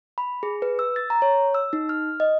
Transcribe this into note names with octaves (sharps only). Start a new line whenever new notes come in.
B5
G#4
B4
E6
A6
A#5
C#5
E6
D#4
F6
D#5